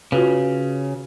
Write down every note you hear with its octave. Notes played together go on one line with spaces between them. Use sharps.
C#3 F4 F#4 B4